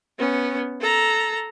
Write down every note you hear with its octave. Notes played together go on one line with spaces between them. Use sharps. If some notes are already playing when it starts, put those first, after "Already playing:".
B3 C#4
A4 A#5